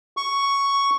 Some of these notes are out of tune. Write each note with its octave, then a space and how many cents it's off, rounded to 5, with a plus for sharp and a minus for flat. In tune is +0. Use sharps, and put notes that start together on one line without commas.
C#6 +5